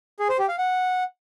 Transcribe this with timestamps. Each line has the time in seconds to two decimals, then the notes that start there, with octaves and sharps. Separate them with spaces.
0.20 G#4
0.29 C5
0.39 G4
0.49 F5
0.58 F#5